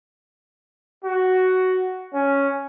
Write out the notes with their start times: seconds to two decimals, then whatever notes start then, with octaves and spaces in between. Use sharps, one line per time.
1.04 F#4
2.14 C#4